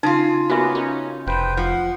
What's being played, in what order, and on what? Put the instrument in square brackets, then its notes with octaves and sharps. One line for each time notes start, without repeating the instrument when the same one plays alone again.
[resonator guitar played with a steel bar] C#3 F4 [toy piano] D#4
[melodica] A#3 C#4 B4 [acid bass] B3 [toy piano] F#4 E5
[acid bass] C#4 [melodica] D#4
[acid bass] F1 [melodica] B4 C5 G5
[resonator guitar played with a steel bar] F3 [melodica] F#5